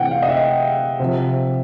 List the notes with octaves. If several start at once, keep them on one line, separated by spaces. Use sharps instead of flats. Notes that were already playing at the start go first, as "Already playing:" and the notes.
Already playing: C3 E3 F#5 G5
F5
D#5
E5
C3 F3